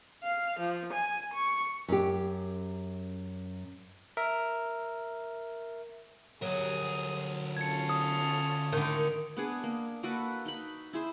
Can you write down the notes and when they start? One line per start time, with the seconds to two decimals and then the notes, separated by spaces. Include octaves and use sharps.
0.24 F5
0.59 F3
0.93 G#5
1.33 C#6
1.88 F#2 G4
4.17 A#4 E5
6.42 D2 F#3 G4 G#4 A#4 D#6
7.57 C#4 F4 A4 G#6 C#7
7.89 D#6
8.72 D3 D#3
9.37 B3 D4 G#4
9.63 A#3
10.03 A#3 F#4 A4 B4
10.46 D#4 B5
10.93 E4 G#4 C5